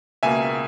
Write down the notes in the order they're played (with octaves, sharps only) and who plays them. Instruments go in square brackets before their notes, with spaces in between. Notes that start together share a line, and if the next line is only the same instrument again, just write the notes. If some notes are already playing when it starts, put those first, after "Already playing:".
[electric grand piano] C#2 B2 A#3 E5 G#5